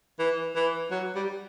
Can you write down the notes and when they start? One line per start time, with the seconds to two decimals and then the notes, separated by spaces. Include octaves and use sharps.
0.19 E3
0.56 E3
0.91 F#3
1.15 G3